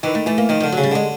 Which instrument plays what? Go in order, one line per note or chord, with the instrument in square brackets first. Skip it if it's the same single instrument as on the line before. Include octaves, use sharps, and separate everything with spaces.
[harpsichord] D#3 [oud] E3
[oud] A3
[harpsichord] E3 [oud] A3
[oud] A#3
[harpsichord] D#3 [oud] F3
[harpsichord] D3 [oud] F3
[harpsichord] C#3 [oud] F#3
[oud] G3
[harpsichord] D3 [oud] G#3